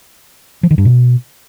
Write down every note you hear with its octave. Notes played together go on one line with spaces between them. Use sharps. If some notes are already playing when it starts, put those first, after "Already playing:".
F3
D#3
G2
B2